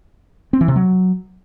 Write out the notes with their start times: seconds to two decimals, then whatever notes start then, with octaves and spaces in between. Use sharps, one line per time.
0.53 C4
0.61 E3
0.68 C3
0.76 F#3